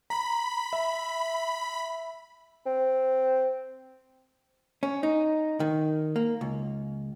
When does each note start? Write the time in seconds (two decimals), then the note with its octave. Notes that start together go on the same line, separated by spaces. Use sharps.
0.10 A#5 B5 B6
0.73 E5
2.66 C4
4.83 C#4
5.03 D#4
5.60 D#3
6.16 A#3
6.41 C#2